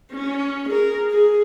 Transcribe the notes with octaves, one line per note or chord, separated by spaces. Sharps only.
C#4
G#4 A#4
G#4